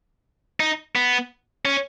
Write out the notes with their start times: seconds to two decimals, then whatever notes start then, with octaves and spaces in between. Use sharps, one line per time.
0.60 D#4
0.95 B3
1.65 C#4